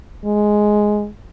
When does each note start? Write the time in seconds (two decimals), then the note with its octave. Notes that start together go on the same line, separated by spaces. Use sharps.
0.25 G#3